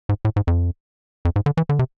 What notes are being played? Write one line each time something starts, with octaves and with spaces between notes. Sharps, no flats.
G#2
A2
G#2
F2
F2
G#2
D3
E3
D3
C3